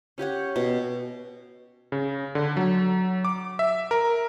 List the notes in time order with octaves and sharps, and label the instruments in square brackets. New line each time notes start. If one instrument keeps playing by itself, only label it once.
[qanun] C#4 G4 C#5 F#5
B2
[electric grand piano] C#3
D3
F#3
D6
E5
A#4